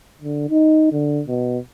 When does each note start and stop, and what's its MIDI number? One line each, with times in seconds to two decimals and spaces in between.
0.21 0.49 50
0.50 0.90 63
0.92 1.21 50
1.28 1.58 47